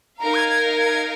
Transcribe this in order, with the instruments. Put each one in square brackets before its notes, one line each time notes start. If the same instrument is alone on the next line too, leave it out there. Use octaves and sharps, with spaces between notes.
[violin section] D#4 A#4 F5 [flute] A#5
[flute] G#6
G#6
G#6